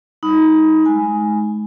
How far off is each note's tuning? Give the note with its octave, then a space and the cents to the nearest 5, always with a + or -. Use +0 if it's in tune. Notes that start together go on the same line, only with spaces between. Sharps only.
G3 +0 D#4 +20 B5 +10
G#3 +35 G#5 +0